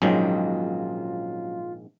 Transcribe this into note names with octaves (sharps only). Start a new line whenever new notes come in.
A#1 G#2 D#3 F#3 C#4 F4